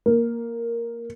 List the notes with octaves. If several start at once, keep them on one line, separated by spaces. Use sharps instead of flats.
A#3